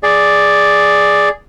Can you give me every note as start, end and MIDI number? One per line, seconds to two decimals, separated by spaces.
0.03 1.29 68
0.03 1.29 74